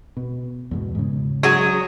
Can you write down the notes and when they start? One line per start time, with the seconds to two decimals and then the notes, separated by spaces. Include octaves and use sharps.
0.17 B2
0.71 E2 G#2 B2
0.95 G#2 C#3
1.43 F#3 F#4 G#4